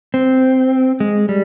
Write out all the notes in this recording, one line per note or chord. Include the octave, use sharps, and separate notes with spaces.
C4
G#3
G3